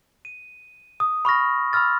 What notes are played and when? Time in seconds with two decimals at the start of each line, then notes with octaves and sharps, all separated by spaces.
0.25 D#7
1.00 D#6
1.25 B5 C#6 F6 A#6
1.73 B5 C6 E6 F6 A6